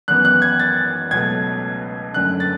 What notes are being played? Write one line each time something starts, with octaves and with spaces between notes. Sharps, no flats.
G#1 F#2 E3 B3 F#6
F#6
G#6
A6
C#2 B2 F#3 A3 G#6
F#1 F#2 D3 A3 C#4 F#6
A6